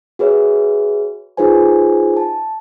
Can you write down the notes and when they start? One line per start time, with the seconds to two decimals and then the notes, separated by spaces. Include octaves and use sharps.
0.19 F#4 G#4 B4 C#5 E5
1.37 D#4 F4 G#4 B4 C5 G#5
2.17 A5